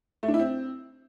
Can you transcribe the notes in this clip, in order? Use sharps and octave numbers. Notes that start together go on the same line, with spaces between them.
A3
D4
E4
C4